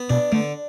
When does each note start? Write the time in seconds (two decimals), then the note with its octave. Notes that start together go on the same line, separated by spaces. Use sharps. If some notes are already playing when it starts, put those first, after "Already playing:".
Already playing: B3
0.10 B2 D4
0.32 D3 A3